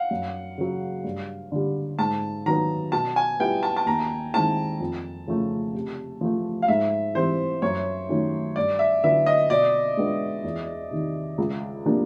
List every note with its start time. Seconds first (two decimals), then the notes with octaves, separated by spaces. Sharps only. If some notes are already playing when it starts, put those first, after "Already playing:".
Already playing: F5 F#5
0.11 F#2
0.58 C#3 F#3
1.04 G2
1.52 D3 G3
1.99 G#2 A5
2.46 D#3 F#3 B3 A#5
2.92 B2 A5
3.16 G#5
3.40 G3 B3 E4 G5
3.63 A5
3.77 A5
3.86 D#2 A#5
4.34 D#3 G#3 C4 E4 A5
4.80 F2
5.27 C#3 F3 A3
5.74 C3
6.21 F3 A3
6.62 F5
6.68 G#2 E5
7.15 E3 G3 C4 C5
7.62 F#2 C#5
8.09 D#3 F#3 A3 C#4
8.56 G2 D5
8.79 E5
9.03 D3 F#3 B3 E4 E5
9.26 D#5
9.50 B2 D5
9.97 G#3 B3 D4
10.44 E2
10.91 C3 D#3
11.38 C#2
11.85 C3 F3 A#3 D4